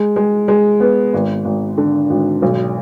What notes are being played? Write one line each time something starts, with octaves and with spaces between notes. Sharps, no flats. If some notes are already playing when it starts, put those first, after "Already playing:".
Already playing: G#3
G#3
G#3
B3
G#1
G#1
D3
G#1
B1